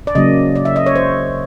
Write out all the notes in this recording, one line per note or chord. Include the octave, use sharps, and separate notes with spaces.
D5
C#3 F#3 A#3 D#5
D5
E5
D#5
C#5
C5